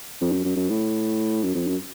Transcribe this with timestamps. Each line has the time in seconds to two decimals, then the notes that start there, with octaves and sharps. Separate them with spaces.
0.21 F2
0.32 F#2
0.45 F#2
0.56 F#2
0.70 A2
1.43 F#2
1.55 F2
1.68 F#2